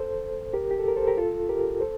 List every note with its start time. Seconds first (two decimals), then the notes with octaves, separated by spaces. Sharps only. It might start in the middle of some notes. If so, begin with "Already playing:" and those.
Already playing: A4 C5
0.53 G4 A#4
0.71 G4
0.79 A4
0.88 A#4
0.97 A4 C5
1.08 G4 A#4
1.17 F4 A4
1.49 G4 A#4
1.81 A4 C5